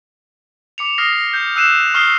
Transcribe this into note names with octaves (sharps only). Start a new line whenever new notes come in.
D6 C#7 F7
D#6 F6 A#6 C7
A#6
G6
E6 F#6 C7 D#7 E7
C#6 D#6 F6 C7 G7